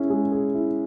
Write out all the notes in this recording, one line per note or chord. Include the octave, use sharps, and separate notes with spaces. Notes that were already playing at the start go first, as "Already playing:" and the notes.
Already playing: C#4 E4 G#4
G#3
G#4
E4